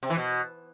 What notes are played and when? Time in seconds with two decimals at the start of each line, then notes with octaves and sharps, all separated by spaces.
0.03 C3
0.10 E3
0.18 B2